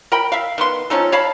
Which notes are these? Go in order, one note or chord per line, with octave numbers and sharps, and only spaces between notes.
A#4 G5 B5
E5 F5
D#3 B3 C6
F3 C#4 D#4 A4
C#5 F5 A5 B5